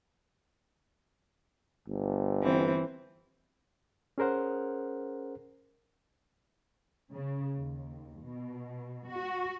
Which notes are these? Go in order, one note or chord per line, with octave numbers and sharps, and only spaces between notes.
G1
E3 C4
C#4 G#4 A#4 C5 F#5
C#3
D#2
B2
F#4